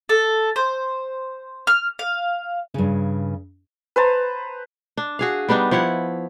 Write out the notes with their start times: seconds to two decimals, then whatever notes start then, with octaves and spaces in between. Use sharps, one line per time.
0.09 A4
0.56 C5
1.67 F6
1.99 F5
2.74 G2 C#3
3.96 B4 C5 A5 A#5
4.97 D4
5.19 F#4 G#4 F5
5.49 G3 B3 D4 D#4
5.71 F3 E4 C#5 F#5